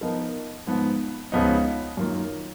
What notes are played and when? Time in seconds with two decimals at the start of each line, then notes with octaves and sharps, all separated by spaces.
0.01 F3 B3 D#4 A#4 D#5
0.67 G#2 F3 B3
1.32 C#2 C#3 F3 B3 D#4
1.97 F#2 D#3 A#3 F4